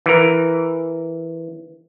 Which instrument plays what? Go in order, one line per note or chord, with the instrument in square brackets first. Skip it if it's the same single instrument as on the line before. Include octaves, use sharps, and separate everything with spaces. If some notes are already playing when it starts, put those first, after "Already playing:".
[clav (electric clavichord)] E3 A#4